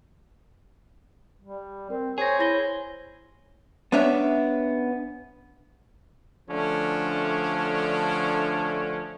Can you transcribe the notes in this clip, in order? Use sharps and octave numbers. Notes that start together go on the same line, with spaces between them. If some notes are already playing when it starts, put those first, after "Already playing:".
G3
C4 A#4
G#4 C5 C#5 G#5 A#6
E4 C#5 A#6 G7
B3 C#4 D4 C#5 E5
D3 F3 A3 C#4 D4